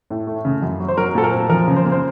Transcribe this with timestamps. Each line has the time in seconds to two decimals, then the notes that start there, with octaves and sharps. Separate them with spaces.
0.10 A2
0.27 A3
0.45 C#3
0.63 F#2
0.80 F#3
0.88 C5
0.97 F#3 A#4
1.15 A#2 A4
1.24 A#4
1.32 C4
1.50 F3 A#4
1.68 C#3
1.76 C5
1.85 A#3
1.92 C5